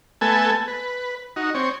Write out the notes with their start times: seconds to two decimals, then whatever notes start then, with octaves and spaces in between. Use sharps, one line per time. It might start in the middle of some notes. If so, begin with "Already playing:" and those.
0.21 A3 B3 A4 G#5
0.68 B4
1.36 D#4 F#4
1.55 C4 C#5